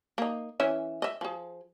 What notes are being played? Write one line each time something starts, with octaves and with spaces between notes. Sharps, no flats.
A#3 D#4
E3 C#4 E5
D#5 E5
F3 G#4